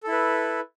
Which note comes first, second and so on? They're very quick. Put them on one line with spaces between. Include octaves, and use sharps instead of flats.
A4 E4 B4